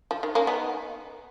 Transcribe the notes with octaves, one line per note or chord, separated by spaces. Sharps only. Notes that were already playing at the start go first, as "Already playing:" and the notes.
F3
D#3
A#3 C#4
B3 D#4